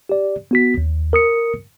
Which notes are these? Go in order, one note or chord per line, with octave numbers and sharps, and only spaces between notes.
G4 D5
B3 F#4 B6
D#2
A#4 D#6 C#7